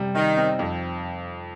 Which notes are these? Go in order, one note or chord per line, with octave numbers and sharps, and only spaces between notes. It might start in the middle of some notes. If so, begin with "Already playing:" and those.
Already playing: C3 G3
D#3 D#4
C4
F2